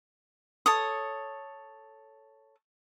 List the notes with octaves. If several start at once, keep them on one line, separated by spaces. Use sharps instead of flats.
A4 C#5 D#6